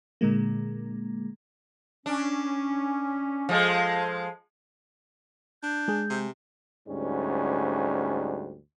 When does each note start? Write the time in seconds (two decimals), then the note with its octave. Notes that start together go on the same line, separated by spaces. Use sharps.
0.21 A#2 D3 G#3 A#3
2.06 C#4 D4
3.49 F3 G#3 A4 C5 F5
5.63 D4 G6
5.88 G#3 G#4
6.10 C3
6.88 D2 G#2 G3 C#4